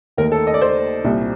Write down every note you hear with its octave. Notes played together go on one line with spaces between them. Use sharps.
D#2 D#3 A3 A#4
A4
D#5
D5
C5
C2 A#2 G3